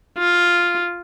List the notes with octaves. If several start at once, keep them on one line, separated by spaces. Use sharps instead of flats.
F4